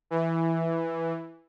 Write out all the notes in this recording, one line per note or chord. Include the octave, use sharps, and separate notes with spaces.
E3